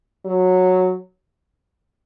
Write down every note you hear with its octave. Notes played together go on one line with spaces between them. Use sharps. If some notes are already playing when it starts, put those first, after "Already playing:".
F#3